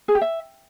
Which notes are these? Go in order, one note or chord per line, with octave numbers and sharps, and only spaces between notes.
G#4
G4
E5